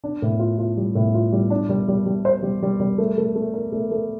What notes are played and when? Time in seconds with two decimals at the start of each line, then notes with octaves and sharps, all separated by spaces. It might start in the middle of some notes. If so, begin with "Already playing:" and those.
0.04 D4
0.22 A2
0.39 F4
0.58 F4
0.77 G3
0.95 A2
1.14 F4
1.32 G3
1.50 D4
1.69 G3
1.88 G3
2.06 G3
2.25 C5
2.43 G3
2.62 G3
2.80 G3
2.98 A3
3.18 A3
3.36 A3
3.54 A#4
3.72 A3
3.91 A3